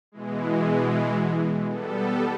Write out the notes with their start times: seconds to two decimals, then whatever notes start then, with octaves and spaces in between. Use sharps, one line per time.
0.12 B2 E3 G#3
1.69 G3 B3 A4